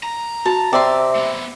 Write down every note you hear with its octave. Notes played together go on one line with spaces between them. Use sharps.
A#5
F#4 A5
C3 D5 E5 G5 C6
A3 B3